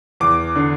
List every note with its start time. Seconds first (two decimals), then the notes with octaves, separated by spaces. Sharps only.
0.20 E2 D6
0.55 D3